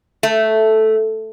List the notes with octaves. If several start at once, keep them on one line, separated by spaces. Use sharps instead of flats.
A3